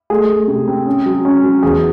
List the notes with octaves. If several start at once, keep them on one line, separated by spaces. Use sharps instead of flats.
A3 G#4
A3
C3
C4
C#4
F#3
C#4
F#3
E2 G#4